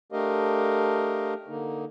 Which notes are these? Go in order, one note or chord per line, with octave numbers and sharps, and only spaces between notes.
A3 D4 G4 A#4 D#5 F5
D3 A#3 D#4